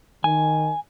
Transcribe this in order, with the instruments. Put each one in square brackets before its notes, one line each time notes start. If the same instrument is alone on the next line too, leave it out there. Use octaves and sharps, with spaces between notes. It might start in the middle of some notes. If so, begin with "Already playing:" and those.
[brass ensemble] D#3 [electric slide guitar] G#5